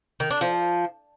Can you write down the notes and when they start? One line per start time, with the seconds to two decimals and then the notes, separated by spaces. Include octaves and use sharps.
0.20 D#3
0.31 D4
0.41 F3